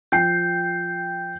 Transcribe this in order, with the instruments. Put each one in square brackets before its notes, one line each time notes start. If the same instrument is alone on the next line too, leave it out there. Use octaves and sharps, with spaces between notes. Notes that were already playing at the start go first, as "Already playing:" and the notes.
[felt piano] F3 G5 C7 [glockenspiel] G6